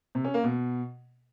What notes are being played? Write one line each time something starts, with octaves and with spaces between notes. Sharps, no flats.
C3
C#4
A#3
B2